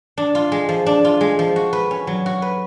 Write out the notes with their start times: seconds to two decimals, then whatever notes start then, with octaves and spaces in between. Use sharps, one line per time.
0.17 D4
0.35 F4
0.52 G#3
0.69 F3
0.86 D4
1.04 F4
1.21 G#3
1.39 F3
1.56 F#4
1.73 B4
1.91 C#4
2.07 F#3
2.26 F#4
2.42 B4